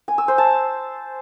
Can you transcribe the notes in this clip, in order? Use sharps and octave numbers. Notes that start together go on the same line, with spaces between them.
G#5
E6
C5
A5